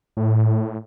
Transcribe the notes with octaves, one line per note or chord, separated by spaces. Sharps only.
A2